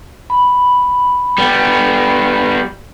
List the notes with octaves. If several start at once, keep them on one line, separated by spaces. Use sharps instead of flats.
B5
G3 B3